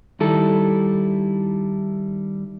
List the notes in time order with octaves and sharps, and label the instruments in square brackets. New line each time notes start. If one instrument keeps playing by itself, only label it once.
[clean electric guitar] D#3 G3 E4 A4